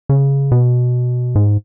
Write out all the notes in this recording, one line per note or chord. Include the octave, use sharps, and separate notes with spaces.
C#3
B2
G#2